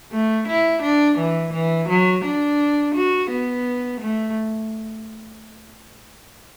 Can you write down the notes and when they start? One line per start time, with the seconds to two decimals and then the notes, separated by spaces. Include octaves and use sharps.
0.12 A3
0.48 E4
0.83 D4
1.19 E3
1.53 E3
1.89 F#3
2.25 D4
2.95 F#4
3.30 B3
4.01 A3